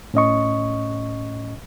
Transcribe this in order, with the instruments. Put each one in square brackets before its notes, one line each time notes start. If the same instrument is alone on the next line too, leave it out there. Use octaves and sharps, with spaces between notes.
[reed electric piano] A2 C#4 D#5 C#6